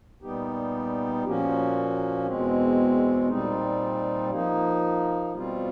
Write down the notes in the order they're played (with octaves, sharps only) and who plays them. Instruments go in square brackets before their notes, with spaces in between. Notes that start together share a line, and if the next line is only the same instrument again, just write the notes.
[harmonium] A#2 G3 B3 D#4 G4
A#2 F3 A#3 C#4 F#4
E2 B2 G#3 C4
A#2 G3 C4 D#4
F3 A#3 D#4
B2 G3 C4 F4